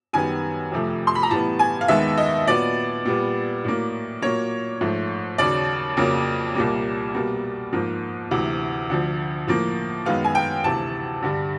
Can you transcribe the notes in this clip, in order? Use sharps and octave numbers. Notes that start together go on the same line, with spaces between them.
F#2 D#3 G3 B3 G#5
F2 C3 F3 A3
C6
B5
A#5
A2 E3 G3 B3 A5
G#5
F5
D#2 D#3 G#3 B3 E5
D#5
A#2 F#3 B3 D5
A#2 G3 B3
A2 F#3 A#3
A#2 F#3 A#3 C#5
G#2 F3 A3
D#2 C#3 F#3 D5
F2 C#3 F#3 A#3
C2 A#2 G3 A#3
B2 G3 A#3
G#2 F3 A#3
D2 C3 E3
D2 D3 F3
A2 F3 A#3
F#2 D#3 G#3 B3 F5
G#5
G5
D2 C3 E3 A5
G2 D3 G3